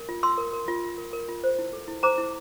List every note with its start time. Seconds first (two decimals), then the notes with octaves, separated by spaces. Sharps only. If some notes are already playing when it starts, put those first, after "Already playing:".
Already playing: A#4
0.09 F4
0.23 F4 C6 E6
0.38 A#4
0.53 A#4
0.68 F4
0.83 F4
0.98 A#4
1.13 A#4
1.29 F4
1.44 C5
1.59 E4
1.73 A4
1.88 E4
2.03 C5 A#5 D6
2.18 E4